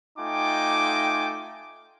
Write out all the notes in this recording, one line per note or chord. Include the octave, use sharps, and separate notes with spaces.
A3 D#4 F4 G5 G#5 D6